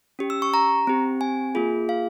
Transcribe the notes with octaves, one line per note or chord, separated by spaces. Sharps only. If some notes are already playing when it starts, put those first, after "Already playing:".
C#4 G4
E6
C#6
A#5
C4 G4
G#5
A#3 F4 G#4
F5